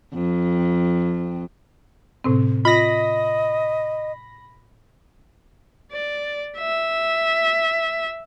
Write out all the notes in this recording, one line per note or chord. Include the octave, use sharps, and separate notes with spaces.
F2
A2 C3 C4
F4 D#5 B5 A#6
D5
E5